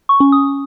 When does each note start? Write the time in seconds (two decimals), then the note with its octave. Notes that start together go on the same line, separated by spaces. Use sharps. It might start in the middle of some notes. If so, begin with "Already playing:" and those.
0.09 C#6
0.20 C#4
0.32 D#6